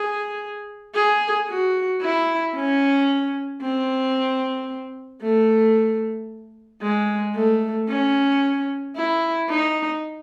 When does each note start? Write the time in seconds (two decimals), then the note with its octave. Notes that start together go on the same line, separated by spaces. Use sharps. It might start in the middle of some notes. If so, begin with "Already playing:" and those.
Already playing: G#4
0.95 G#4
1.49 F#4
2.01 E4
2.56 C#4
3.62 C4
5.22 A3
6.82 G#3
7.35 A3
7.89 C#4
8.96 E4
9.49 D#4